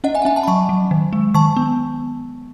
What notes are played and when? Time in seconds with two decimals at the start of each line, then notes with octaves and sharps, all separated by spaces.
0.04 C#4 D#5 F#5
0.15 E5 G#5
0.22 F#5
0.25 C#4 E5 G#5
0.36 F#5 A5
0.43 B5
0.47 F#3 A5 C#6
0.69 F#3
0.91 D#3
1.13 G#3
1.34 D#3 A5 C#6
1.57 B3